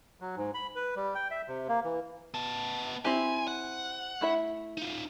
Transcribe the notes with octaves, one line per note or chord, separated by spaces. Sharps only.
F#3
G#2
B5
B4
G3
G5
E5
C3
A#3
E3
B3 A5
C4 E4 G4 G#5
F#5
A3 E4 E5
D#4 F4